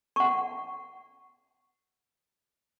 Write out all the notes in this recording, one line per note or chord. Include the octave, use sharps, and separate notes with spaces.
F#5 C#6